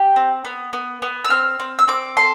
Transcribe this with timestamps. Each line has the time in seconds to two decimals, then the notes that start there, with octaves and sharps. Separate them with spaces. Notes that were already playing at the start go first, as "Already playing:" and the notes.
Already playing: G4
0.16 C4
0.45 B3
0.73 B3
1.02 B3
1.25 E6
1.30 C4 F6
1.60 C4
1.79 E6
1.88 C4 D6
2.17 A4 C6